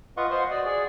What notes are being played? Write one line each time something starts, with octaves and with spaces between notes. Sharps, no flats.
F4 B4 D#5 F5 F#5 C#6
C5 D#5 F5 F#5 C6
F#4 D5 D#6
G#4 D5